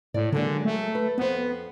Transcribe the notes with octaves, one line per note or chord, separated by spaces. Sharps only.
A2 D5
D3 F#3 G#3 A#3
A3
B4
F2 B3 C5